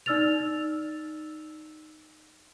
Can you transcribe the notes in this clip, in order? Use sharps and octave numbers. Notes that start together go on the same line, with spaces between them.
D#4 D5 E6 F6 A6 F7